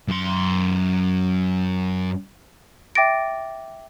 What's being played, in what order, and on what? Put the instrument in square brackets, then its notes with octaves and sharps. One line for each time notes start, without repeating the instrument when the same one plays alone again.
[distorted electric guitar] F#2 C6
[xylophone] E5 G5 D6 A6 A#6 D7